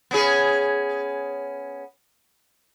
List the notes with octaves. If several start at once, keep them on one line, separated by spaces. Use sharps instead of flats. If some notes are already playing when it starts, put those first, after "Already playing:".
B3 C#4 G#4